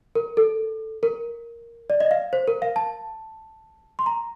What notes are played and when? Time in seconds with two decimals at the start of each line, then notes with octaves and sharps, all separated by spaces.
0.15 A#4
0.37 A4
1.03 A#4
1.90 D5
2.00 D#5
2.11 F5
2.33 C5
2.48 A#4
2.62 F5
2.76 A5
3.99 C6
4.06 A#5